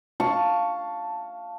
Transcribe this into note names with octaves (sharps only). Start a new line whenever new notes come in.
F5 A5 C#6